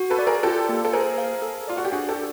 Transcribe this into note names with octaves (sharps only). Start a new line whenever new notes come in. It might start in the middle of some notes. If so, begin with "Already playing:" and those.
Already playing: F#4
A4 B4
D5
G#4 A#4
F4 G4 A4
A#3
A4
G#4 A#4 C5
F5
A4
F4 D5
F#4
G4
D4 F#4 G#4
G4 A4
F#4